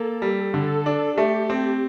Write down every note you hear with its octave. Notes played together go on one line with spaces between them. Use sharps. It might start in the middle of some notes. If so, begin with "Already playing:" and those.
Already playing: A#3 A4
G3
D3 A4
D4
A3 G4
C4